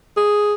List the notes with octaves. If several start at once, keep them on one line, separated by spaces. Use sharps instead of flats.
G#4